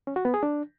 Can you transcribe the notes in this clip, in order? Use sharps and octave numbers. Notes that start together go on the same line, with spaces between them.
C#4
F#4
B3
G#4
D4